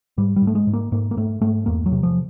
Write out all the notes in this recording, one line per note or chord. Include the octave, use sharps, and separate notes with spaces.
G#2 G3
G3
G#2
A3
G#3
G#2
A#3
G#2 A#3
A#3
G#2 A3
G#2 A3
E2 A#3
F#3
C3
F3